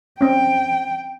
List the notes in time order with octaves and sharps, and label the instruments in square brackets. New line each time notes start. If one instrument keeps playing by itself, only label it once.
[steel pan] C4 C#4 [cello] G5